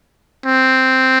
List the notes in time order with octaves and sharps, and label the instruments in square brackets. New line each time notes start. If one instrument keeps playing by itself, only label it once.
[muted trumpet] C4